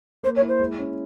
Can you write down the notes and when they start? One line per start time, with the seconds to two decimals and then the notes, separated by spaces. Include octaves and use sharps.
0.23 A#3 C5
0.36 C#5
0.42 E4
0.48 C5
0.59 G#3
0.79 C#4